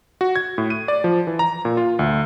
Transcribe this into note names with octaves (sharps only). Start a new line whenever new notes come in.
F#4
G#6
A2
D#7
D5
F3
E3
A#5
A#2
F4
D2